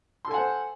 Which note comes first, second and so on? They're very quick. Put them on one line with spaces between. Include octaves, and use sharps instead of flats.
C6 A4 G#5 F#5 C5